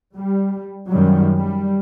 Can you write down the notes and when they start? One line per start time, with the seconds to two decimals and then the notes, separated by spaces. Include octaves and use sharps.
0.16 G3
0.90 F#2 D#3 F#3 G3
1.38 G3